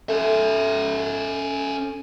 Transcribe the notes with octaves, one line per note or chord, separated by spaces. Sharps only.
C#4 A4 E5